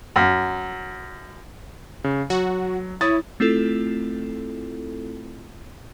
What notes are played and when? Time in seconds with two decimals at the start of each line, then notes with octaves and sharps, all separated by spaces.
0.16 F#2
2.04 C#3
2.30 F#3 F#4
3.01 E4 C#5 D#6 A6
3.40 A3 C4 E4 F4 A4